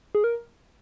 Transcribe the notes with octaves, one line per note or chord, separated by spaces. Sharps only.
G#4
A#4